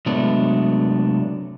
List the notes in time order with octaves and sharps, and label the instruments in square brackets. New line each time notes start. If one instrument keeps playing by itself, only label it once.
[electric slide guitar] C3 F#3 G#3 A3 B3 D4